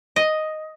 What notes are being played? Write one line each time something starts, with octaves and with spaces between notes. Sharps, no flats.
D#5